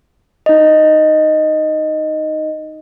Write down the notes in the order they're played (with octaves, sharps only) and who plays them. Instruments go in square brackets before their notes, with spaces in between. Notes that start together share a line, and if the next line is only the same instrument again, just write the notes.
[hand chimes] D#4 D#5